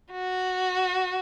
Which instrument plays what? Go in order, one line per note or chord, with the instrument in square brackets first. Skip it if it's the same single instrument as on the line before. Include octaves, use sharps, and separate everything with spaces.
[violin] F#4